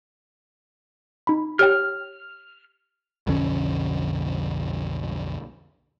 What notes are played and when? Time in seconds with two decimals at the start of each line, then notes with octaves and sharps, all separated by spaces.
1.27 D#4 B5
1.59 G4 C#5 G5 F6
3.27 B1 F2 D3 C#4